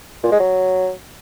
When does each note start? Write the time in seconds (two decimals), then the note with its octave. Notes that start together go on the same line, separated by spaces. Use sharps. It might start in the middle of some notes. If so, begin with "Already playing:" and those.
0.23 A#2
0.32 G#3
0.40 F#3